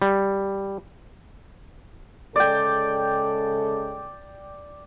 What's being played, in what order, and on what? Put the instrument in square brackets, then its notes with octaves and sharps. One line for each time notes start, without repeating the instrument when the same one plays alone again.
[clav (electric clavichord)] G3
[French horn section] C#3 G#3 A4 [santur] D5 G5